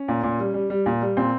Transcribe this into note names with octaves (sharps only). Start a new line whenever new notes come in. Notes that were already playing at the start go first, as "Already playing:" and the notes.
Already playing: C#4
A#2
A#2
G3
G3
G3
A#2
G3
A#2 C4